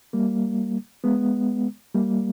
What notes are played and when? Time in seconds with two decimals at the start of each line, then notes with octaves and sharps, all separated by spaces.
0.13 G3 A#3
1.04 G#3 B3
1.94 G3 A#3